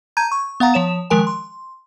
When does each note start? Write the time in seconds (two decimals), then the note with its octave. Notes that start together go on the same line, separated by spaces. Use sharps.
0.17 A5 A#5 G6 G#6 D#7
0.32 C#6
0.60 B3 F5 F#5 A#5
0.74 F3 C#5 E7
1.10 D#3 F3 G#3 A#4 G#5
1.27 C6